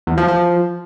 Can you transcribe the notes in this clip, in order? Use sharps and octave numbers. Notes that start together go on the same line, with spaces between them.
E2
F3
F3